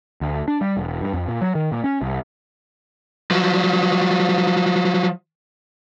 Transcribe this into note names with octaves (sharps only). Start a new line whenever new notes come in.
D2
D4
G3
E1
G2
F2
A#2
F#3
D#3
A#2
C#4
C2
F3 F#3